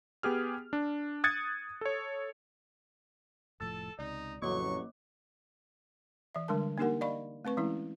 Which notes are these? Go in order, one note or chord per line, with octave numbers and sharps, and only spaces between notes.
B3 G4 G#4 F6
D4
D#6 F#6 G#6 A6 C#7
A4 C#5
F1 A2 F3 A4 E6 A6
C#2 C3 D#4 D5
A1 F2 C#3 F#3 A#3 C#5 C#6 D6
E3 E5
D3 G3 G#3 D4 A#4 A5
A#3 D4 D#4 G4 A#4 F#5
D5 D#5 F5 B5 C#6
A3 C4 B4 C#6
E3 G#3 C#4 E4